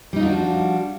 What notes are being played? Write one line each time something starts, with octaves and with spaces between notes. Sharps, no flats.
F3 G3 D4 D#4 F#4